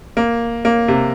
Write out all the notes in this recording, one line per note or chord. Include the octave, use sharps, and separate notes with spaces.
A#3
A#3
C3